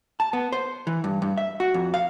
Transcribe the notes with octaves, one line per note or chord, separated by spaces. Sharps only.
A5
B3
C5
E3
G2
G2
E5
F#4
F2
F5